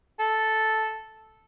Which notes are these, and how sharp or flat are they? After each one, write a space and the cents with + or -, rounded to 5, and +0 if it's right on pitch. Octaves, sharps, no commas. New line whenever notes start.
A4 -5